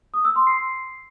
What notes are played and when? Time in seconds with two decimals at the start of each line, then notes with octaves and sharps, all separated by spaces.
0.14 D#6
0.25 E6
0.36 C6
0.47 C7